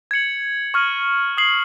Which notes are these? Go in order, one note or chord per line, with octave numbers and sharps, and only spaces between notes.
G#6 C#7 F#7
C#6 F6 G#6 D#7 F#7
D#6 G#6 C7 F#7